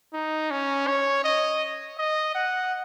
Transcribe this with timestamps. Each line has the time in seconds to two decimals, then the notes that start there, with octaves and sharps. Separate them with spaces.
0.14 D#4
0.51 C#4
0.87 C#5
1.24 D#5
1.98 D#5
2.35 F#5